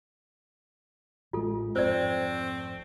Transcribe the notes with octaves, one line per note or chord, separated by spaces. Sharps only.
A1 G#3 F4 A4
G#1 F2 A3 C4 C5 D5